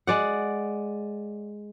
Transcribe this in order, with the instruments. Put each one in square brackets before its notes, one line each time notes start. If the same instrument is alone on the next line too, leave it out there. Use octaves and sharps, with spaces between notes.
[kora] G#3 D5 F#5